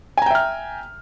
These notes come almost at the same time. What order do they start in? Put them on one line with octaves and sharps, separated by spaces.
G#5 A#5 G5 E5 F6